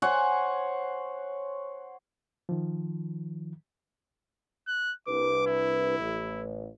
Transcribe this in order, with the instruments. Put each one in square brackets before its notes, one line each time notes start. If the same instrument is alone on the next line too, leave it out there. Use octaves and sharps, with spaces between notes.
[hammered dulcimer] C5 C#5 F#5 G#5
[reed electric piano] D#3 F3
[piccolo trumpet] F#6
[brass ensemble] C2 D4 B4 [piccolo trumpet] D6
[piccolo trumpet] E4
[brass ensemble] A1